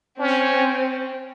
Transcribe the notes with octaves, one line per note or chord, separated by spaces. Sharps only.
C4 C#4